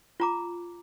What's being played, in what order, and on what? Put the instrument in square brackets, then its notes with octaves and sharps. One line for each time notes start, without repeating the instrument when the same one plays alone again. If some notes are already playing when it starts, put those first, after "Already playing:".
[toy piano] F4 A#5 D6